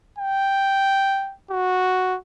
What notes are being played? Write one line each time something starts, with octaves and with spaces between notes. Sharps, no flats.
G5
F#4